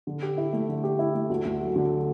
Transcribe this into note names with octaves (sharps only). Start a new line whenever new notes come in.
D3
G4
E4
A3
D3
G4
E4
A3
D2
D2
F#3
D3